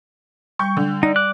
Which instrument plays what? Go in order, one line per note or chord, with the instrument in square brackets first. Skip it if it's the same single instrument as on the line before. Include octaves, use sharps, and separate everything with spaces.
[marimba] G3 [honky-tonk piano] C#6 G6
[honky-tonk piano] D3
[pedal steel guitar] D#4 [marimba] D5
[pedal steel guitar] D6 F#6